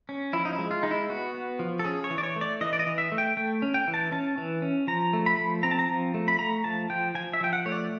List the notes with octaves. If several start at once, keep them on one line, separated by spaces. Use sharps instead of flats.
C#4
F3 E4
D#4
E4
G#3
F4
G#3 D#4
E4
B3 F#4
B3
F3
A4
C#4 G#4
C#5
E3
D5
C#5
A3
D5
E3 D#5
D5
D#5
E3
E5
A3
G5
A3 G5
C#4
G5
E3
A5
C#4 A5
E3
C#4
F3 A#5
A3
B5
F3
C4 A#5
A5
A#5
F3
A3
B5
A3 A#5
F3 A5
F3 G5
F3 G#5
E5
F3 G5
F#5
A3 C#5
D5